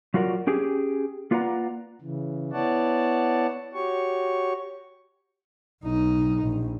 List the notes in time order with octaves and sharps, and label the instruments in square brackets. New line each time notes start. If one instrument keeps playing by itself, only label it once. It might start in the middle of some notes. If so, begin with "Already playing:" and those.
[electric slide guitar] F#3 F4 F#4 A#4 D5
C#4 G4 G#4
A#3 F4 B4 D5 F#5 A#5
[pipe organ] C#3 E3
B3 E4 C#5 D5 F#5 A5
F#4 G4 C#5 C#6
[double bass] B1 D#4
A#1